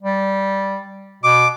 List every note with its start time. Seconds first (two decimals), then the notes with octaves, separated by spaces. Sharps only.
0.03 G3
1.24 B2 D6